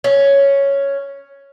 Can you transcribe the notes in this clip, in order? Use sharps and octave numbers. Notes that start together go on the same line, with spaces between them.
C#4